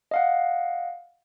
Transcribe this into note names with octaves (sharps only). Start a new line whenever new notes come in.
D#5 F5 F#5